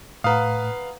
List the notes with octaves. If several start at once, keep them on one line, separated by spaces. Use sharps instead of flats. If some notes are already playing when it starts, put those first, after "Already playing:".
A2 B4 F5 F#5 A#5 D#6